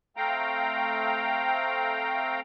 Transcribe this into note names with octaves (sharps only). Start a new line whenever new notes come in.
A3 C4 F5 G5 A#5